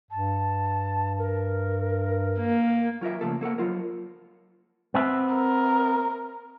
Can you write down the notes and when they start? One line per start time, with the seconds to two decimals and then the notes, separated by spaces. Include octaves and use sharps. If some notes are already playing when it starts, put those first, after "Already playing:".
0.11 G2 A5
1.19 A#4
2.39 A#3
3.01 F#3 F4 A#4 E5
3.21 C#3 E3 F3 A3 A#3 A4
3.41 A#3 A4 A#4 F#5
3.58 F#3 F4 A#4
4.94 B3 C4 E5
5.34 A#4